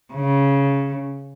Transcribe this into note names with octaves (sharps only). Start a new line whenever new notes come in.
C#3